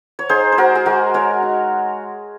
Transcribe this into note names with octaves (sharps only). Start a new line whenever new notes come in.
C#5
D#4 G#4 C5
C5
G#3 F#4 A#4
G#4
G#3 F#4 A#4
G#3 A#4 C#5
D#4